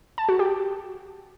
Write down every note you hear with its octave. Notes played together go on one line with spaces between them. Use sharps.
A5
F#4
G4